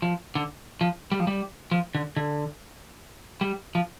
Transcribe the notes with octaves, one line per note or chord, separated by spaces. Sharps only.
F3
D3
F3
G3
F3
G3
F3
D3
D3
G3
F3